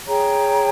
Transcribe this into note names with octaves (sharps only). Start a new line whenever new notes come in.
G#4 C#5 G5 A#5